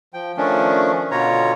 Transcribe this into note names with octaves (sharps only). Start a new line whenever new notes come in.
F3 G5
D#3 F3 A3 C#4 D4
B2 D3 F4 C#5 A#5